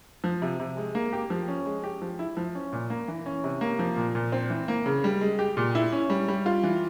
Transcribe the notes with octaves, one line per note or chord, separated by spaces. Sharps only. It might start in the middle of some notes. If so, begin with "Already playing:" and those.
F3
C3
C3
G#3
A#3
G4
F3
C#4
G#3
G4
F3
E4
F3
C#4
A#2
A#3
E3
C#4
C3
A#3
F3
A#2
A#2
C4
E3
A#3
C#3
G3
G#3
G4
A#2
E4
C#4
G3
G3
F4
E3